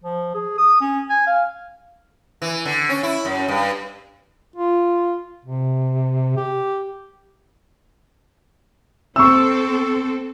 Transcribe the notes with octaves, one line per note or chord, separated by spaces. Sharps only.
F3
G#4
D#6
C#4
G#5
F5
E3
D3
C#4
E4
F#2
G2
F4
C3
G4
C4 A4 C#6 E6